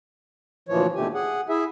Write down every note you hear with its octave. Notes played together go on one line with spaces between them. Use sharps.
D2 A#2 E3 F3 C#5
D#2 B2 D3 A3 G4 G#5
G#4 F#5
E4 G#4 E5